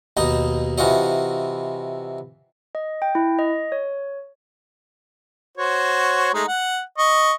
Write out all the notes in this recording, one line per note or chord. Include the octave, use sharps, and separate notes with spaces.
D#2 B2 D#4 D#5
C3 E3 F4 F#4 D#5
D#5
G5
E4
D#5
C#5
F#4 C5 C#5
G#3 A3 D#4
F#5
D#5 C#6